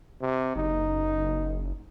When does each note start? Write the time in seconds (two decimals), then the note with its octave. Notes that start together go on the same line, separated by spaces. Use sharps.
0.21 C3
0.56 F#1 D#4